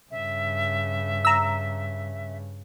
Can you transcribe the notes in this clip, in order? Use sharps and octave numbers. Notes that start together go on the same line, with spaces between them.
G2 C#3 E5
A#5 E6